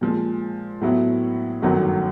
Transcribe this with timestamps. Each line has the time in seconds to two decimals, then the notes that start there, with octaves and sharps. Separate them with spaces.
0.01 A#2 F3 G#3
0.81 A2 F#3 B3 E4
1.62 G1 F#2 D#3 F#3 A3